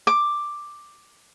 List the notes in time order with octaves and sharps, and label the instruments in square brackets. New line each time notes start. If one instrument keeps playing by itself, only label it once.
[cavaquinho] D6